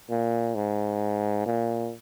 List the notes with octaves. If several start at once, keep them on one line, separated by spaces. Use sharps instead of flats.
A#2
G#2
A#2